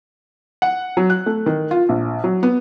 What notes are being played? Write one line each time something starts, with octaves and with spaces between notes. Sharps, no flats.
F#5
F#3
F#6
A3
D#3
F4
A#1
F#3
B3